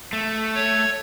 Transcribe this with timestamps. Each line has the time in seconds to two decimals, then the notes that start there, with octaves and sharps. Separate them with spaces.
0.13 A3
0.55 C#5